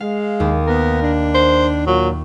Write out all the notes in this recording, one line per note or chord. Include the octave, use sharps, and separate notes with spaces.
G#3 F5
D#2
B3 A#4
D4
C5
A#2 F#3